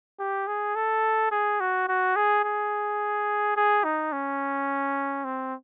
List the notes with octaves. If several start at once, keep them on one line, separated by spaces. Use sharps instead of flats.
G4
G#4
A4
G#4
F#4
F#4
G#4
G#4
G#4
D#4
C#4
C4